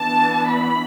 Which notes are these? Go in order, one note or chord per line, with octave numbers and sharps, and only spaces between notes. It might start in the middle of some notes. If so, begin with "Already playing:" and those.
Already playing: E3 B3 D4 A5
B5